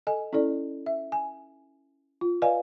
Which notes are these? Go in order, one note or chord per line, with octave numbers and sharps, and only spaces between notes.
A4 D#5 G#5
C#4 E4 A4 D5
E5
G#5
F4
B4 D5 D#5 F5 G#5